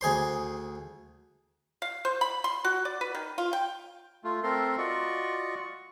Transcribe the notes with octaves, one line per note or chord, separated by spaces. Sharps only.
D2 G#4 C5 C6
F5
C5
B5
C6
F#4
D5
B4
D#3
F4
G5
A3 F4
A3 C4 A4 A#4 C6
F4 F#4 D5 D#5 C#6